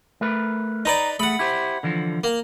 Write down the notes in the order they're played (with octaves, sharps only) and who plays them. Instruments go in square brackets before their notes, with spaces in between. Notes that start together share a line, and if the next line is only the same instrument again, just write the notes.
[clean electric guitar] A3 A#4 B4
[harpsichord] D#4 B4 D5 [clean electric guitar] D#5 A#5
[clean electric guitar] A3 G#4 [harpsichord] F#5 B5
[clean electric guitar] E4 G4 C5
D3 E3 F3
[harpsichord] A#3